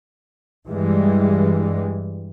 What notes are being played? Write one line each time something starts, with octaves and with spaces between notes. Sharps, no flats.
G2 E3 G3 G#3